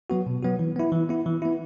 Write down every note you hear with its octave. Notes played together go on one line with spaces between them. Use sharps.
F#3 B3 F#4
B2
F#3 B3 F#4
E3
B3 E4
E3
B3 E4
E3
B3 E4